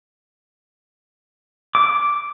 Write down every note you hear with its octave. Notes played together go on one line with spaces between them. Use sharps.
D6